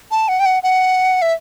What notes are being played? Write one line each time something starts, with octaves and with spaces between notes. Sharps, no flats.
A5
F#5
G5
F#5
F#5
E5